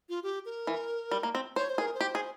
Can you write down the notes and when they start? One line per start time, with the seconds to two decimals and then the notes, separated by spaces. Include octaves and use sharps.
0.09 F4
0.23 G4
0.45 A#4
0.67 E3
1.11 G3
1.23 A#3
1.35 C4
1.56 C5 C#5
1.69 C5
1.78 G#4
1.81 A#4
1.94 C5
2.01 G4
2.15 G#4